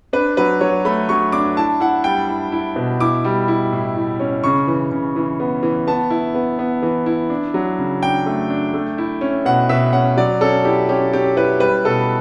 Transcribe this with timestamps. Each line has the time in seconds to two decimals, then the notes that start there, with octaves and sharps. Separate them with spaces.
0.13 D4 B4
0.37 F#3 B4
0.61 F#3 C#5
0.85 A3 B5
1.09 F#3 C#6
1.32 D4 D6
1.57 E4 A5
1.80 E4 F#5
2.04 G3 G5
2.29 E4
2.52 E4
2.76 B2
3.00 E4 D6
3.24 G3
3.48 E4
3.72 A2
3.96 A2
4.20 C#4
4.44 C#3 C#6
4.68 E3
4.91 C#3
5.16 E3
5.40 B3
5.63 E3
5.87 B3 A5
6.10 E4
6.34 B3
6.59 B3
6.82 E3
7.06 E4
7.30 D4
7.54 F#3
7.78 C#3
8.02 D4 G5
8.26 A3
8.50 D4
8.74 A3
8.98 E4
9.21 C#4
9.45 B2 F#5
9.69 B2 E5
9.93 C#4 F#5
10.17 F#3 D5
10.41 C#4 A4
10.65 E4 G4
10.89 C#4 G4
11.13 C#4 G4
11.36 E4 B4
11.60 G3 B4
11.85 B2 A4